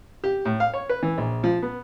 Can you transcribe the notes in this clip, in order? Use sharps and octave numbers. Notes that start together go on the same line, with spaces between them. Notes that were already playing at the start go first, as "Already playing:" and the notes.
G4
A2
F5
C#5
B4
E3
A#1
F3
B3